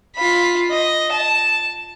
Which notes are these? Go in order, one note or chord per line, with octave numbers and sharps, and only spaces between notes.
F4 B5
D#5
A5